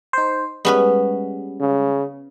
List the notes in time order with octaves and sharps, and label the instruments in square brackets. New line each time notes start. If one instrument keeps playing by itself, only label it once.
[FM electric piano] D#4 C5
[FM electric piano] G3 G#3 [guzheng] B3 C#4 B4
[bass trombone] C#3